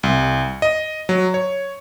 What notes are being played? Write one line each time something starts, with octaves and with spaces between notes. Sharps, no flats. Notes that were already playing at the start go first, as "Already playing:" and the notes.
C2
D#5
F#3
C#5